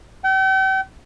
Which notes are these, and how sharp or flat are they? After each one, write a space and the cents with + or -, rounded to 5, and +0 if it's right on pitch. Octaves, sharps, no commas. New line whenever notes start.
G5 -40